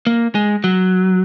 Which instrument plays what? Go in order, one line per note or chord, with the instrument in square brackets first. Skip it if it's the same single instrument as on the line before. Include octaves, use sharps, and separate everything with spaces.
[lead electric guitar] A#3
G#3
F#3